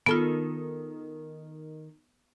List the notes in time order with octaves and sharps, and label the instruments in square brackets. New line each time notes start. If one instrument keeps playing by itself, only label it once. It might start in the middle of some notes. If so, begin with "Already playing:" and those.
[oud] D#3 A4 [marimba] B3 F4